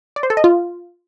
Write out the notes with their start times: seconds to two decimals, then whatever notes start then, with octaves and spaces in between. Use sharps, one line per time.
0.16 D5
0.23 C5
0.30 A4
0.37 D#5
0.44 F4